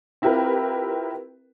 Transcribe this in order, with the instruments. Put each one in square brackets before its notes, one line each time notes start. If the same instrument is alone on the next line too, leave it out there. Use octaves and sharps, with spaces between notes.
[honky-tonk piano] C4 E4 F4 G4 A#4 B4